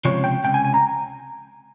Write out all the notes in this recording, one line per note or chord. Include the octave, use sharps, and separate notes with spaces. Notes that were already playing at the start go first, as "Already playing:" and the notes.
C#2 C3 F3 C4 C#5
G5
C#2 C3 G5
G#5
G#5
A#5